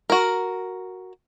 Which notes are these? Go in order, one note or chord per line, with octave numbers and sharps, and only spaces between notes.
F#4 A#4